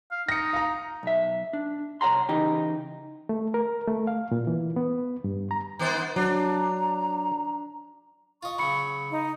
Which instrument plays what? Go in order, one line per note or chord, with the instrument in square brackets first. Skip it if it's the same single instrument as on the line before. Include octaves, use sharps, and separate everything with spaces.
[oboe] F5
[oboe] D#4 [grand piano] A#6 C#7
[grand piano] F5 A#5
[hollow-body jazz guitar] B1 E5
D4
C2 C#5 F#5 A#5 C6
C#3 E3 D#4 G4
[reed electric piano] A3
A#4
A3
F5
A#2
E3
B3
G2
A#5
[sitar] D#3 B3 C5
[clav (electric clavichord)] F#3 [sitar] D4 [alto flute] A#5
[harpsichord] F4 D#5 [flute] C#6
[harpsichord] C#3 F#3 [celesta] B5 C#7
[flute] D#4